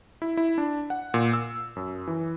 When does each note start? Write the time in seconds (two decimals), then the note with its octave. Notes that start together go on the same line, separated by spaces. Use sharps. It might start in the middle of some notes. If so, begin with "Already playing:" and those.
0.22 E4
0.37 E4
0.58 D4
0.90 F#5
1.14 A#2
1.33 E6
1.76 F#2
2.07 E3